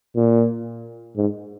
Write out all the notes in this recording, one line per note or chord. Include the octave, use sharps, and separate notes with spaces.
A#2
G#2